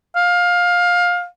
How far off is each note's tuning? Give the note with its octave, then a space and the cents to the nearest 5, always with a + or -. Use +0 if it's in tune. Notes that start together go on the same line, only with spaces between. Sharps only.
F5 +20